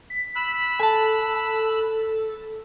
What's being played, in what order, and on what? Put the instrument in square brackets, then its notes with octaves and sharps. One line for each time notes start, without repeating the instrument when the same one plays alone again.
[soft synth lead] B6
[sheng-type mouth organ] B5 E6 F#6
[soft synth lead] A4 [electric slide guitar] G#5 A5